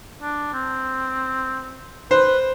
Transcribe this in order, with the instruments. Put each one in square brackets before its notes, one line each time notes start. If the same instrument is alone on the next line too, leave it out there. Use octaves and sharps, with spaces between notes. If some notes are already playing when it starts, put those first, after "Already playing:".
[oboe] D4
C4
[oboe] B4 [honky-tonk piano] C5